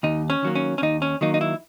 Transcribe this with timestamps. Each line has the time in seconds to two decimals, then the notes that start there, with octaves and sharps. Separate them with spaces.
0.03 D#2 D#4
0.30 C#4
0.42 D#3 F#3 A#3
0.55 C#4
0.78 C#4
0.82 D#2 D#4
1.02 C#4
1.21 D#3 F#3 A#3 D#4
1.34 D#4
1.41 E4